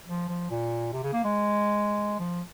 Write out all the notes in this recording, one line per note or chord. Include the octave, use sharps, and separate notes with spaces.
F3
F3
A#2
C3
C#3
A#3
G#3
F3